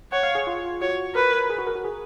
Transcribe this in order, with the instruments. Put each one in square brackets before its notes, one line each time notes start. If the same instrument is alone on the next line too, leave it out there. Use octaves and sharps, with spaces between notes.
[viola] C#5 [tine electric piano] F#5
[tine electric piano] F5
G#4
F4
[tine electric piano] F#4 [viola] C#5
[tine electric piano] A#4 [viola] B4
[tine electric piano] G#4
F#4
A#4
F#4
G#4